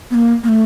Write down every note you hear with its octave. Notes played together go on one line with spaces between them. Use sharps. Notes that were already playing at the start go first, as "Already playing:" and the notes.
B3
A#3
A#3
A3